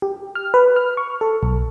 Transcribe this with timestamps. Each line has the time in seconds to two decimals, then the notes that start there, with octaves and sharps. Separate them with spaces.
0.02 G4
0.35 F6
0.54 B4
0.76 F6
0.97 C#6
1.21 A4
1.43 B1